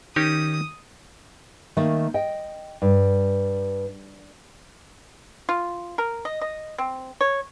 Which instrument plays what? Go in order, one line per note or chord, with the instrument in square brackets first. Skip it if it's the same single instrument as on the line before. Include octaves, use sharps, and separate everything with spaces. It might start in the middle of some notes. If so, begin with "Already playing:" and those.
[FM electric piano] D#3 [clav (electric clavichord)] C#4 D#4 G4 [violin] D#6
[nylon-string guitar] D#3 A3 A#3
D#5 G5
G2
[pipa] F4
A#4
D#5
D#5
C4
C#5